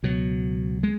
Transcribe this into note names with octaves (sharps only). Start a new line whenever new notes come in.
C#2 B2 F#3
G#3